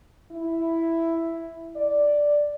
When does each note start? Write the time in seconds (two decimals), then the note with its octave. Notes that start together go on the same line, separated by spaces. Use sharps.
0.32 E4
1.76 D5